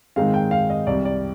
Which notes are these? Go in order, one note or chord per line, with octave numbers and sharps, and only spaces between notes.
G#2 D#3 G#3 C4 F5
G5
F5
D#5
C2 C3 G3 D5
D5